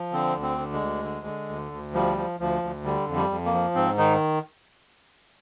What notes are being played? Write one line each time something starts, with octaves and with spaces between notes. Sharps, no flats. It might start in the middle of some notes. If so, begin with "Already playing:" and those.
Already playing: F3
D3 C4
D2
C4
D3
G#3
D2
D3
D3
D2
D2
F3 G3
F3
D2 F3
D2
D3 G3
F2
G3
F2
A#3
F3
G#2 C4
D#3 D#4